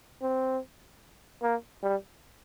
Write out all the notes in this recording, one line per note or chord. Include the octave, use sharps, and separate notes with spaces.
C4
A#3
G3